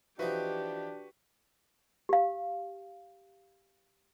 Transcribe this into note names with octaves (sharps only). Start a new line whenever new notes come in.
E3 F3 D4 D#4 F#4 G4 B4
G4 F5